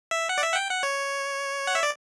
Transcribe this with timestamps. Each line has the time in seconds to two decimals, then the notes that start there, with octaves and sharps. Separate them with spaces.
0.11 E5
0.29 F#5
0.38 D5
0.43 E5
0.52 F#5
0.56 G5
0.70 F#5
0.83 C#5
1.67 F#5
1.75 E5
1.83 D5